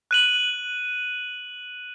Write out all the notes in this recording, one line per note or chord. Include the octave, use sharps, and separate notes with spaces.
F#6 D#7 F#7